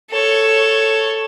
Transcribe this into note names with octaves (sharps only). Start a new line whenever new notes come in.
A4 C#5